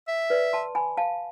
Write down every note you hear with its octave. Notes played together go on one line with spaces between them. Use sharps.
E5
B4 D5
A5 C6
G#5 B5
F5 A5